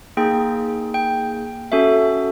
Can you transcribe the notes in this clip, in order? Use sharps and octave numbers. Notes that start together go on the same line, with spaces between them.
A#3 D#4 G#4 G5
G5
C#4 F#4 A4 E5